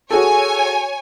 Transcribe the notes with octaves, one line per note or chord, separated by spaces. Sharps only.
F#4 G#4 A4 C#5 G#5